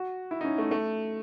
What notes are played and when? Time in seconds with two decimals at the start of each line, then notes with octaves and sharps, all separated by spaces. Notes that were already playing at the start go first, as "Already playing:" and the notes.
Already playing: F#4
0.31 E4
0.41 D#4
0.45 C#4
0.58 A3
0.71 A3